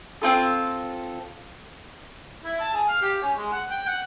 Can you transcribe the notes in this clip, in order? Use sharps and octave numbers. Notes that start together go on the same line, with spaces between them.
C4 F4 A4
E4
A5
G#4
F5
G4
C#4
G#3
F#5
G5
F#5